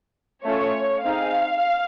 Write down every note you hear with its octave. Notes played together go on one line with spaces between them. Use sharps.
A3 C#4 F4 C#5
C4 D#4 G#4 F5